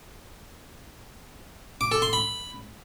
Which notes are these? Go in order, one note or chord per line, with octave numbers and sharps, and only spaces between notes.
D6
A4
C6
B5